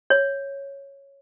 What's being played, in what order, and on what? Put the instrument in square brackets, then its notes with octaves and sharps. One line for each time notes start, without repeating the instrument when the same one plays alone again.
[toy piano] C#5